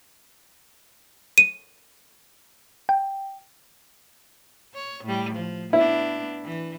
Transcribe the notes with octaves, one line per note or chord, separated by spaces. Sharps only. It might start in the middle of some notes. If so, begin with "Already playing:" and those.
D#7
G5
C#5
A2 G3
F3
B3 D4 E4
E3